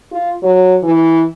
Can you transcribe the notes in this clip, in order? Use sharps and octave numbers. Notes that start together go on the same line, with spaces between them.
F4
F#3
E3